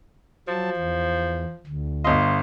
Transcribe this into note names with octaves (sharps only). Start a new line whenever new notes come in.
F3 F#3 A5
E2
D2
G1 F4 D#5